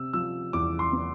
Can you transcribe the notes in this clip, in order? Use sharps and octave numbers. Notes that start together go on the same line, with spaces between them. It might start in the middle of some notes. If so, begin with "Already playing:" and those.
Already playing: C3 E6
F3 E6
E2 D6
C6
B3